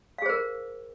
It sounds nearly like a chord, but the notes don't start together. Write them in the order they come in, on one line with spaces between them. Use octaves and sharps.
F5 G#4 C5 A#4